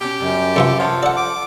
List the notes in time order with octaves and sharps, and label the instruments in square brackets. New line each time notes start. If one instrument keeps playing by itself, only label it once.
[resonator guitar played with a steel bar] B2 C#4 [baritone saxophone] G4
[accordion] F#2 [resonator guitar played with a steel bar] C#3 G3
[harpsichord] C3 E3 F4 [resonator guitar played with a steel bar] A4 F5
[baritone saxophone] F3 [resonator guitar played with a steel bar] C#5 F#5 A5
[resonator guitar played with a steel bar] A4 [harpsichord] D5 F#5
[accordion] D6